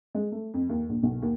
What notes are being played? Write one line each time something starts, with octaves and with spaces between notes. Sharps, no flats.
G#3
A3
F2
D#2
A#1
B1
D#2